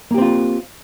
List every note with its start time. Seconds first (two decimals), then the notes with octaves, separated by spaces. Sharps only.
0.11 A#3
0.14 G4
0.18 C4
0.22 F4